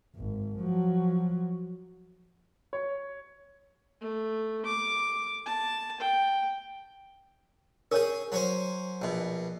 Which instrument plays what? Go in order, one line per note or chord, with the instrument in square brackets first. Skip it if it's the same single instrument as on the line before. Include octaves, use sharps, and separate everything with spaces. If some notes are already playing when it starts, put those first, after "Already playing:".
[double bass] G#1
F3 F#3
[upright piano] C#5
[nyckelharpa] A3
D6
A5
G5
[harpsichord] C#4 G#4 [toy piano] A#4 C#5
[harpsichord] F#3 C#4 C5
A#1 B2